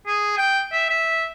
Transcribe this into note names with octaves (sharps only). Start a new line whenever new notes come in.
G#4
G5
E5
E5